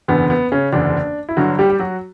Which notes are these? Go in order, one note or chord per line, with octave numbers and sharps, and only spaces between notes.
F#1 E2 D3 B3
B3
C#3 C#4
F#1 E2 D3 D4
E4
G1 G2 D3 F#3 F#4
G3 G4
G4
F#3 F#4